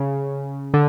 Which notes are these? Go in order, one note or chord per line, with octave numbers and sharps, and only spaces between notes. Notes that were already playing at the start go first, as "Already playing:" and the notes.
Already playing: C#3
D3